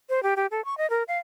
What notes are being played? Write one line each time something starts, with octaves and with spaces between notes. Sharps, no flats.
C5
G4
G4
A4
C#6
D#5
A#4
F5